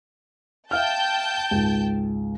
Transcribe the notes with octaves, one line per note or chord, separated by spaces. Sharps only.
E5 F5 G5 A5 F6 G6
G#1 C#2